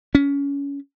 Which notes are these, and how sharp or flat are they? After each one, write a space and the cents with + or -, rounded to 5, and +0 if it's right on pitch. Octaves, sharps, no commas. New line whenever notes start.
C#4 +25